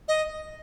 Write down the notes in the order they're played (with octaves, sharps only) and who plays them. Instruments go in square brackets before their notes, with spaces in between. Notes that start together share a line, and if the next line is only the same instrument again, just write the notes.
[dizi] D#5